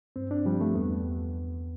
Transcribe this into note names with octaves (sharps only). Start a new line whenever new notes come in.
G2 C4
D4
F3 G3
A3
E2 B3